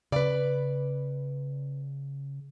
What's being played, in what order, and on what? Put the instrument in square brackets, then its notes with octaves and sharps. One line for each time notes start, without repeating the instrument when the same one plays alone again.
[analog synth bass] C#3 [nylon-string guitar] B4 D5